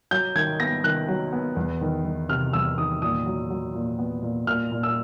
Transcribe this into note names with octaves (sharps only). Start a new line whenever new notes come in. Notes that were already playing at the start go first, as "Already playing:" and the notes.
F#3 G6
D#3 G#6
B3 A#6
D#3 F#6
F#3
B3
E2
D#3
D#3
C3 F6
E2 E6
D#3 D#6
A#2 D#6
F#3
F#3
A#2
B3
A#2
A#2 F6
A#2
E6